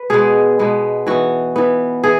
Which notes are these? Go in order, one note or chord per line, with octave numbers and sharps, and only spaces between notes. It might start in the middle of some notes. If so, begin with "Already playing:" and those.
Already playing: B4
B2 G#3 B3 G#4
B2 G#3 B3
E3 B3 F#4
E3 B3
E3 G#4